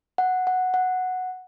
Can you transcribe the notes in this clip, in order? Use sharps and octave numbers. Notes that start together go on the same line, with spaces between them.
F#5
F#5
F#5